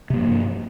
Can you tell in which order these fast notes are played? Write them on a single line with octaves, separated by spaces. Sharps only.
C3 A#3 F3 G2